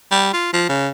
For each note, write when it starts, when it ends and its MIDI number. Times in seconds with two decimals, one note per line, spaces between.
0.11 0.32 55
0.33 0.52 65
0.53 0.65 53
0.69 0.89 49